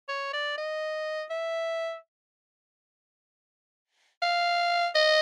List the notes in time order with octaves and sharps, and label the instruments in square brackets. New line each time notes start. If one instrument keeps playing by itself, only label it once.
[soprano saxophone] C#5
D5
D#5
E5
F5
D#5